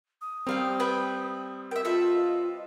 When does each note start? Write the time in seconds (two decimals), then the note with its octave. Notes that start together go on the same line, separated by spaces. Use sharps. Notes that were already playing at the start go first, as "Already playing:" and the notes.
0.21 D#6
0.47 G3 C4 A#4 F5 G5
0.80 B4 E5 G5
1.71 A#4 E5 G5
1.85 F4 A4 B4 D#5 E5